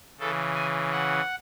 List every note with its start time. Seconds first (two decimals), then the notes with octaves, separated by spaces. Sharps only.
0.19 C#3 E3 A4
0.55 G#5
0.91 F#5